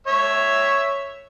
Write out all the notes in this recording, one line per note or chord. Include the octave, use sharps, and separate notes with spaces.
C#5 E5